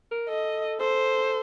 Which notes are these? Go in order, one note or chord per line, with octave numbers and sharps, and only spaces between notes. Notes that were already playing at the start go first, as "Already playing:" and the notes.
A#4
A4 D#5
A4 C5